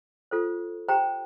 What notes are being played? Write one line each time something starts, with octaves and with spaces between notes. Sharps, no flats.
F4 A4 C5
G4 C5 G5 A#5